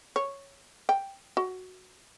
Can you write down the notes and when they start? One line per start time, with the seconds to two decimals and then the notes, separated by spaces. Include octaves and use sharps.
0.16 C#5
0.89 G5
1.37 F#4